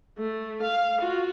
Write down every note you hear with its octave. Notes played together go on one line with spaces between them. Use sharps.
A3
F5
F4 F#4